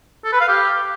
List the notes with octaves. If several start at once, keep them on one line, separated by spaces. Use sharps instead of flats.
A4
B4
F5
G4